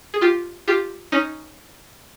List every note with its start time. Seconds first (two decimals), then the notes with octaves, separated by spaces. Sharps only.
0.14 G#4
0.21 F4 G4
0.68 F4 G4
1.12 C#4 D#4